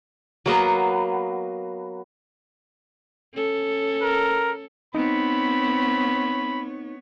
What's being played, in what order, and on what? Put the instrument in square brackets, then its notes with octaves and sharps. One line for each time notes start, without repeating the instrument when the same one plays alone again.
[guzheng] F#3 A#3 B3
[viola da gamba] C#4 A4
[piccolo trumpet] A#4
[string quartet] B3 C#5 [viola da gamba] C4 [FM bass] D#4 [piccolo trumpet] B5